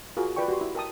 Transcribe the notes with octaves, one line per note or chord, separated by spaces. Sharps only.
F4 F#4 G#4 A#4
F4 B4 D5 G5 C#6
F#4 G4 C6
E4
A#4 G5 A5 D#6